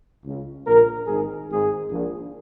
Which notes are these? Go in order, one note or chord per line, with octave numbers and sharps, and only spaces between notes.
C#2 C#3
A#1 A#2 A#4
G#1 G#2 D#3 G#4
G#1 G#2 D#3 G#4
A#1 A#2